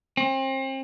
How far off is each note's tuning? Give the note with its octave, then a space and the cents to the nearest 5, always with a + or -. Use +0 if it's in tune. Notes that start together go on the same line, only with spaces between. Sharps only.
C4 +35